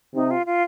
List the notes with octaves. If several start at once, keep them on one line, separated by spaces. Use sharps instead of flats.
C3 D#4
F4
F4